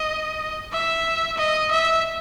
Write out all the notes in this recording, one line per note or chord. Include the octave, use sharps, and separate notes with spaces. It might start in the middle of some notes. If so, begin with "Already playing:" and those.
Already playing: D#5
E5
D#5
E5